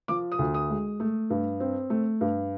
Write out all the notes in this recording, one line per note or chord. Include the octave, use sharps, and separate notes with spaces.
F3 D6
D#6
D2
D#6
G#3
A3
G2
C4
A3
G2